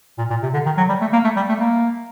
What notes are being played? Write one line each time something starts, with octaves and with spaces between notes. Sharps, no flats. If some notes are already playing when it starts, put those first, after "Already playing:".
A#2
A#2
C3
D3
D#3
F#3
G3
A3
A#3
A3
G3
A3
A#3